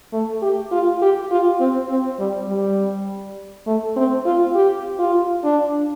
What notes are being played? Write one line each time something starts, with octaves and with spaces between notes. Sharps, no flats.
A3
G4
F4
G4
F4
C4
C4
G3
G3
A3
C4
F4
G4
F4
D4